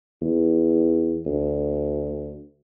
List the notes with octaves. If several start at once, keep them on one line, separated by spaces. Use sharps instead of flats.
E2
D2